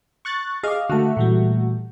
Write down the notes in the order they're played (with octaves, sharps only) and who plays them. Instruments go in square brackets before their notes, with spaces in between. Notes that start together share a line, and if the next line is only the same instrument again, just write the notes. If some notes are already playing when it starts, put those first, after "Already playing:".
[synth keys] C#6 F#6 A6
[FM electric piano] G#4 D6 [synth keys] D#5 F5
[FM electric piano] D3 A5 [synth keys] A3 F#4
[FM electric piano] A#2 E3 G3